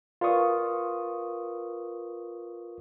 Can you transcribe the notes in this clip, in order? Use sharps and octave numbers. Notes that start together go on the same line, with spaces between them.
F4 A#4 B4 D5 C#6 D#6